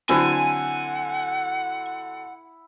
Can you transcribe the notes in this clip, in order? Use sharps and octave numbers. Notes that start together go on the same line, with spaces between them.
D3 F#3 C4 E4 F#5 G#5